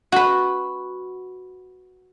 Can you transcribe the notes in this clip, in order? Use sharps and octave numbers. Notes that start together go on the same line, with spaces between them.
F#4 B4